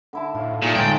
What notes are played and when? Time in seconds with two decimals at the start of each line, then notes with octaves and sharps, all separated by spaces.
0.13 D3 E4 A5
0.35 A2 F4
0.62 A#2 A3 D#4 G#4
0.76 G1 G#3 G5 C6 A6